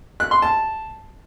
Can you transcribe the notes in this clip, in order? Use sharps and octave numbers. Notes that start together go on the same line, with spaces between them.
F#6
C6
A5